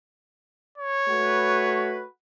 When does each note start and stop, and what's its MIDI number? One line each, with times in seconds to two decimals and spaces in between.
0.78 2.04 73
1.08 2.04 57
1.08 2.04 66
1.08 2.04 71